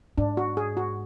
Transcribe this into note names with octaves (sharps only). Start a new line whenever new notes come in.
G#2 D4
F#4
G#4
F#4